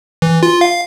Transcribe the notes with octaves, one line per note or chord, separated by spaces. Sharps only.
E3
F4
F5